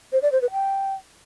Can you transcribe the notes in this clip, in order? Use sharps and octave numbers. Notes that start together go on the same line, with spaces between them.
C5
D5
C5
B4
G5